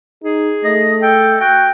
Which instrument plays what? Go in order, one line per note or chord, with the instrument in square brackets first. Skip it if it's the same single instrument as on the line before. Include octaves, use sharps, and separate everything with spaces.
[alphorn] D#4 [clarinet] G#4
[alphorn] A3 [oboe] D#5
[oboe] A4 [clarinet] G5
[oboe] F#4 [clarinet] G5